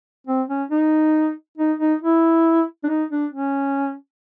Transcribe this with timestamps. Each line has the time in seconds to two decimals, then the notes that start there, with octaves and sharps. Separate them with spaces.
0.27 C4
0.48 C#4
0.71 D#4
1.58 D#4
1.79 D#4
2.01 E4
2.83 D4
2.89 D#4
3.11 D4
3.33 C#4